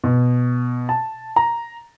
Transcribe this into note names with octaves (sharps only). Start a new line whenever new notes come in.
B2
A5
A#5